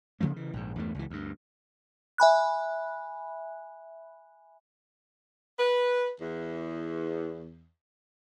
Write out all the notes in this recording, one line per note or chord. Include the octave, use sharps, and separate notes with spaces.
C#3 F3 A3 A#3
C#3 E3
A#1 G#2
E2 G2 A3
C#2 E3
D2 G2
E5 G#5 B5 F#6
B4
E2